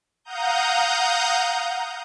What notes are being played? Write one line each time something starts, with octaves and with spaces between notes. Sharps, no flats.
F5 F#5 A#5 D#6 G6